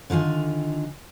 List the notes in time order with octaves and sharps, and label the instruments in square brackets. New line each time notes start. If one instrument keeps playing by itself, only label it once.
[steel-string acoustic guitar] D3 D#3 F4 G#5